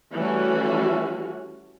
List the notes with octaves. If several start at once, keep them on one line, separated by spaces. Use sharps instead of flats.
E3 G3 A3 C#4 F#4